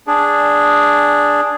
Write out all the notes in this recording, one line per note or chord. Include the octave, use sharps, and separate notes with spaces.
D4 G#4